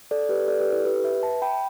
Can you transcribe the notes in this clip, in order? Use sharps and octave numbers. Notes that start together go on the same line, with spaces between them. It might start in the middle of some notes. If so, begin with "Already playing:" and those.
A4 D5
G4 B4
A4 D5
G4 B4
E4 A4
G4 B4
B4 E5
E5 A5
G5 B5